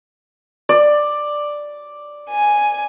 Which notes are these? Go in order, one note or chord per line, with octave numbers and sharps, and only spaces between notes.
D5
G#5